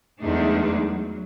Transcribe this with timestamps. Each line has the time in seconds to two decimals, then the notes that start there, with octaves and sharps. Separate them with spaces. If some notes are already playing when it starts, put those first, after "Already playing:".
0.22 E2 F#3 G#3 A3 D4 D#4
0.88 F#3